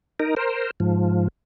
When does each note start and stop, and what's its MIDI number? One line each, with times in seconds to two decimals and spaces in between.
0.20 0.35 63
0.20 0.35 70
0.37 0.71 70
0.37 0.71 72
0.80 1.28 44
0.80 1.28 53